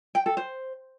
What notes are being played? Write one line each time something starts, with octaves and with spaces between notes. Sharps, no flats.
G5
A4
C5